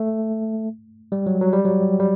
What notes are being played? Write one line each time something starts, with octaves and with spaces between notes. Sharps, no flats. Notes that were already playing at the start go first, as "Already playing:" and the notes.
Already playing: A3
G3
F#3
F#3
G3
F#3
G3